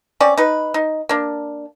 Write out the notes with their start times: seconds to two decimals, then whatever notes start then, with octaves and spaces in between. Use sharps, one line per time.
0.20 C4 C#4 D5
0.37 D#4 B4
0.74 D#4
1.09 A#3 D4